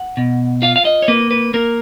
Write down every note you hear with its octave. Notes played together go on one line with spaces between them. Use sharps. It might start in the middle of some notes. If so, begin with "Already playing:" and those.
Already playing: F#5
B2
F4 F5
F5
D#5
C#5
A#3 B4
B4
A#3 A#4